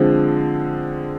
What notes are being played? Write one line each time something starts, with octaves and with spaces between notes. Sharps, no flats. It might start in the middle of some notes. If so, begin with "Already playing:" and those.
Already playing: D3 F3 G#3 C4